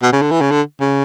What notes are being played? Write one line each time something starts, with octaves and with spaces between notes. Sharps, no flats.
B2
C#3
D3
E3
C#3
D3
C#3